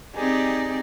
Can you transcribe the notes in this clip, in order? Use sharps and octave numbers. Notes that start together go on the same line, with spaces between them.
C4 D#4 G4 G#4 D5